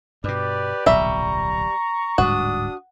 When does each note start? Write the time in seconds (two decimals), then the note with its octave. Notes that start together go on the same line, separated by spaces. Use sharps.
0.24 G2 B2 G4 B4 D5
0.86 D1 B1 A#2 G3 E5 A#5 C#6
2.18 D1 G#2 G3 D4 F#4 D#6